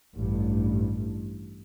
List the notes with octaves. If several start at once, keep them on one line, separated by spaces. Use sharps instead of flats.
A1 G2